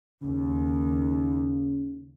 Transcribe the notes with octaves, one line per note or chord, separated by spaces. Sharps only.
D#2 C#3